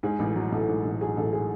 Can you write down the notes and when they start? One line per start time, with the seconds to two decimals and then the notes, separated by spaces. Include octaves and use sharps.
0.03 G#2 G#4
0.19 A1
0.36 F#3
0.52 A1 A4
0.68 G#2
0.85 A1
1.01 F#3 G#4
1.17 A1 A4
1.33 G#4